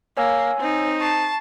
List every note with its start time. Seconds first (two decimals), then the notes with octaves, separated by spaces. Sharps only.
0.17 A#3 C#5 G#5 E6
0.60 C4 D#4
1.01 A5 C#6 C7